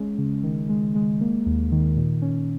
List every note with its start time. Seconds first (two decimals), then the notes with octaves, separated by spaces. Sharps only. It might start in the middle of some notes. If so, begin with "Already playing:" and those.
Already playing: G#3 C#4
0.18 C#3
0.43 D#3
0.69 G#3
0.95 G#3
1.21 A#3
1.46 D#2
1.72 D#3
1.97 A#2
2.22 C#4